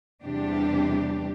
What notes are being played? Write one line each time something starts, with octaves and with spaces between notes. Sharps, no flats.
E2 C3 G3 D4 G4